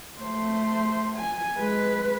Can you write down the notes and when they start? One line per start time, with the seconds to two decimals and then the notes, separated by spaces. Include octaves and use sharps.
0.21 A3 C5
1.17 G#5
1.57 G#3 B4